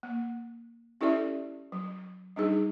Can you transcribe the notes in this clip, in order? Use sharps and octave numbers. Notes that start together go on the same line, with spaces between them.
A#3
C#4 E4 G4 A4 D5 E5
F#3
G3 D4 D#4 G#4